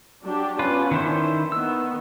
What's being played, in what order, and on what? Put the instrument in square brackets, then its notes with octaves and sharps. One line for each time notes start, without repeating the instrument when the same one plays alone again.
[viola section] F#3 D4 G4
[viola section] B3 C#4 D4 [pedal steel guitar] F4 B4
[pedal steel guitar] D#3 E4 C5
[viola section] D#3 B3 [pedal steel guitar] E6